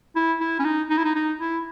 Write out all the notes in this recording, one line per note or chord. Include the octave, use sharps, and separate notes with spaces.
E4
E4
C#4
D#4
D#4
E4
D#4
D#4
E4